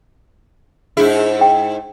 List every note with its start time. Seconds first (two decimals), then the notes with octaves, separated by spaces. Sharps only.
0.97 G#2 D4 E4 G#4
1.41 G5